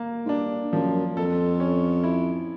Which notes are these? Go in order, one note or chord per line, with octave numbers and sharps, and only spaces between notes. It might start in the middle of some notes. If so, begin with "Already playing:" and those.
Already playing: A#3
G#2
G2 D4
F#2 F3
F2 A4
C#4
E4